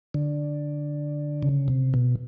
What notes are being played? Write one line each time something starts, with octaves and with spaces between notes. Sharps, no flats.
D3
C#3
C3
B2